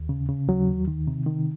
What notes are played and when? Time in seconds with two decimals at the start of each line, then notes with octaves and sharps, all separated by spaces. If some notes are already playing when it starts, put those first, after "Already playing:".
Already playing: D#2
0.09 C#3
0.29 C#3
0.48 D#2 F#3
0.68 D#2
0.88 D#3
1.07 C3
1.26 D#3